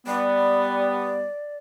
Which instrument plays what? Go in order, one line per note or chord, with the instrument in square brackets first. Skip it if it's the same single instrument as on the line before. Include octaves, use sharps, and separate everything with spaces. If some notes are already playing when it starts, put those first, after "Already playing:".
[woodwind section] G3 B3 [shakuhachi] D5